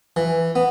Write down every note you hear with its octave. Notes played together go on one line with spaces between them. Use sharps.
E3
B3